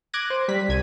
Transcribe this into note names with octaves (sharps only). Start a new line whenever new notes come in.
D6 F#6 G#6 A#6 D#7
C5
G3 B6
C2 G#6 D#7